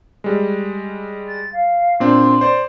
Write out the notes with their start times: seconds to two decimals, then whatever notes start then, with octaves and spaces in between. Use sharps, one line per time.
0.24 G3 G#3
1.27 A6
1.52 F5
2.00 A#2 C4 D4 C6
2.41 C5 D5